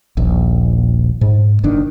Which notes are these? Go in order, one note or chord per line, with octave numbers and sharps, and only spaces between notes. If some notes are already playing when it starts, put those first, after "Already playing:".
D#1 A#1
G#2
F#1 D#3 D4